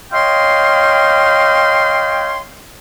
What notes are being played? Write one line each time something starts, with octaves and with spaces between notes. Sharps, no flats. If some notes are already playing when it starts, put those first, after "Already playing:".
C#5 D#5 F5 G5 C6